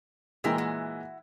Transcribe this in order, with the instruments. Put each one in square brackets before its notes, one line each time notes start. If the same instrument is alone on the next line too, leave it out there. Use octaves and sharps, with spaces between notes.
[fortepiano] A#2 E3 G#3 [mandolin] E4 A#4 G5
[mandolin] E4 F#4